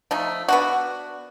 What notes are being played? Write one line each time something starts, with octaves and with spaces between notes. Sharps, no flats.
F3 A3 D#4
B3 D4 F#4